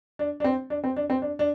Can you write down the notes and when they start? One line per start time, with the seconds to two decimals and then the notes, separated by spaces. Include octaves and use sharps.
0.19 D4
0.40 D4
0.44 C4
0.70 D4
0.84 C4
0.96 D4
1.10 C4
1.22 D4
1.39 D4